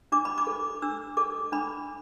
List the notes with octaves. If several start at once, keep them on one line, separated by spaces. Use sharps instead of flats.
D4 D6
B5
D6
A4
D4 E6
A4 D6
D4 B5